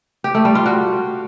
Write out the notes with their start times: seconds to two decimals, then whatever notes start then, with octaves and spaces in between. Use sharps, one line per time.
0.24 G4
0.35 A3
0.45 G3
0.55 F4
0.66 F#4